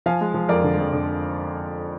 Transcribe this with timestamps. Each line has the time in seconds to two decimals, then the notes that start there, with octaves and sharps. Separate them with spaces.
0.06 F3 F5 G#5
0.21 G#3
0.34 F3
0.49 F2 A#4 D5
0.64 D3
0.78 F2
0.93 D3